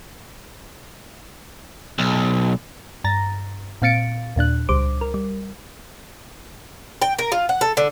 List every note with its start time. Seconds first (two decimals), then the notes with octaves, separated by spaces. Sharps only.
1.99 B1
3.04 G2 A#5 A6 A#6
3.82 A#2 C4 F5 A6 C#7 D7
4.36 D#2 A#2 D4 F#6
4.69 C#2 G3 C5 D6
5.01 A#4
5.14 G3
7.02 G5
7.19 A#4
7.32 F4
7.49 F#5
7.61 A4
7.77 D3